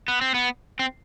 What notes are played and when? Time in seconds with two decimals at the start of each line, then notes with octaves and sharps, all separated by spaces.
0.08 B3
0.21 C4
0.34 B3
0.79 C4